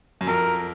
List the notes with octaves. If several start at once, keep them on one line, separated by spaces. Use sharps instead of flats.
F#2
F2 A#4